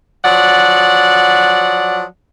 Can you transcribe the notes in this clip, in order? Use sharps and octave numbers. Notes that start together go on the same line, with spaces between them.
F3 F#3 D5 F#5